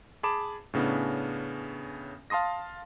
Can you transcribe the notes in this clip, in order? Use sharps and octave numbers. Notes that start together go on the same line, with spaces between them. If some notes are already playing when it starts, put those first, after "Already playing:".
G#4 A5 B5 D6 E7
A2 C#3 B3 C#4 D4
F5 A5 C6 D#6 A#6